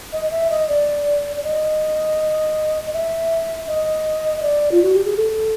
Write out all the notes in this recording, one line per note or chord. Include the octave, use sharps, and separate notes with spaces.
D#5
E5
D#5
D5
D5
D#5
D#5
E5
D#5
D#5
D5
F4
F#4
G4
G#4
A4